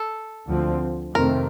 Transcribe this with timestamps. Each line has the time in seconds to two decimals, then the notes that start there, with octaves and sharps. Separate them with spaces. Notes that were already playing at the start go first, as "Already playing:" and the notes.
Already playing: A4
0.47 D2 D3 F3 C4
1.15 F2 C3 D#3 A3 C4 A#4